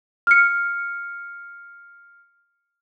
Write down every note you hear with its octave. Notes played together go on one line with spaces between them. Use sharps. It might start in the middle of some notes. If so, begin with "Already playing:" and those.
F6 C#7